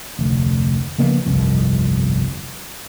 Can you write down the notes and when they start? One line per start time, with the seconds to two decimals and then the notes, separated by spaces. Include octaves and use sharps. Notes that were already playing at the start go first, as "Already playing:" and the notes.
0.19 F1 D2
0.98 C#3 F3 A#3 B3
1.25 G1 C2 F2